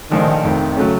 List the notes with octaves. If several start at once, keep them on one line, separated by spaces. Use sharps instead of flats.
A#1 A2 D#3 F3
F1 F2 D#3
C#3 F#3 A3 C#4